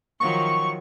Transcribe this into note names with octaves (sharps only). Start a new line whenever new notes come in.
D#3 F3 F#3 C#6